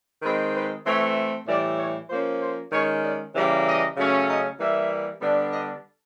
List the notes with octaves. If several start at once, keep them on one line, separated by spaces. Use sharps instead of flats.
D#3 G#3 C4 B4
B4
E3 A3 C4 C#5
A2 E3 G3 D5
C#5
F3 A#3 C#4 C5
C5
D#3 G#3 C#4 C#5
D5
C#3 E3 G3 A#3 D5
D#5
C#3 F#3 A3 C#4
D#5
E3 G3 A#3 E5
D3 G3 B3 D4
D#5